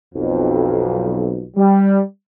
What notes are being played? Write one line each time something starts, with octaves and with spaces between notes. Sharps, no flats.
B1 F2
G3